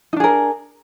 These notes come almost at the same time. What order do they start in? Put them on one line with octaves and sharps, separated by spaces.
D#4 D4 G#4 A#4